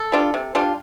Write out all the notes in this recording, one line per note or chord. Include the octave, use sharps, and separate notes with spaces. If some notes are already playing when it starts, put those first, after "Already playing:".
Already playing: A4
G3 D4 F4
C3
G3 D4 F4